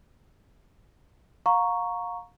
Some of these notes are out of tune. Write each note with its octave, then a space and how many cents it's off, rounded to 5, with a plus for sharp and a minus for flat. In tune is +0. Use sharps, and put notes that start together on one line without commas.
F5 +30 A#5 +0 C#6 +0